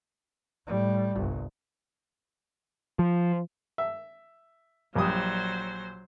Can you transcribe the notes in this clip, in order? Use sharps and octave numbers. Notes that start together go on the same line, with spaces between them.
A2 G3
G1 C2
F3
E5
A#1 F#3 G3 C5 D#6